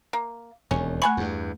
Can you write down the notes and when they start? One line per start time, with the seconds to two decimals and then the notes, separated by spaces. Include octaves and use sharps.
0.13 A#3
0.71 E1 D#2 C#4
1.02 A3 F#5 G#5 B5 C#6
1.17 E2 G2